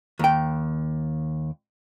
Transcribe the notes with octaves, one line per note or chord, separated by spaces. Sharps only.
D#2 G5